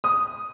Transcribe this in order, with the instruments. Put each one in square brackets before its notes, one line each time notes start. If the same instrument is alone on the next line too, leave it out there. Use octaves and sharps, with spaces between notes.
[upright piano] D#6